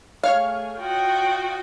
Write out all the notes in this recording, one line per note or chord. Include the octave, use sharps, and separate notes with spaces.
A3 G#4 C#5 F5 F6
F4 F#4 D#5 G5